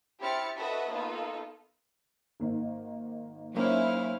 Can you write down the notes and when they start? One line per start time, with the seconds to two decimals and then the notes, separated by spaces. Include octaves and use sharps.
0.20 C4 E4 G4 F6 A6 C#7
0.58 F#4 A4 B4 D#5 E5 F#5
0.89 A#3 B3 D#4 F4 A4
2.40 G#1 A#3 D#4
3.54 F#3 A#3 C#4 D#4 E4 C5 F5